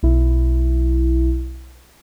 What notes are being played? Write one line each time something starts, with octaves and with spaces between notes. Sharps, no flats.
B1 E4